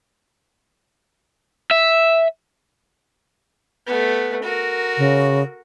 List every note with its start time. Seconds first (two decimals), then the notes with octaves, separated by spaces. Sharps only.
1.71 E5
3.87 A3 B3
4.43 F#4 A#4
4.98 C#3